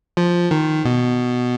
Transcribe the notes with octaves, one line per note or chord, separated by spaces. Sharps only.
F3
D#3
B2